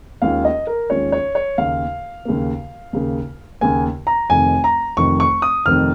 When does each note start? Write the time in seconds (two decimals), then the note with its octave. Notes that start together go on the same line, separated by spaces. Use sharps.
0.22 D#2 D#3 G#3 C#4 F4 F5
0.45 D#5
0.67 A#4
0.90 D#2 D#3 G#3 C#4 F4 C#5
1.12 C#5
1.35 C#5
1.58 D#2 C#3 A#3 F5
2.25 D#2 C#3 A#3
2.93 D#2 C#3 A#3
3.61 D#2 C#3 A#3 G#5
4.07 A#5
4.29 F1 F2 D#3 G#5
4.64 A#5
4.97 F1 F2 D#3 C#6
5.20 C#6
5.42 D#6
5.66 F1 F2 D#3 F6